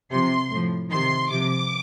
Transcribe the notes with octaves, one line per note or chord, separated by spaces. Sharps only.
C3 F3 C6
A2 F3
C3 D#3 C6
C3 F3 D6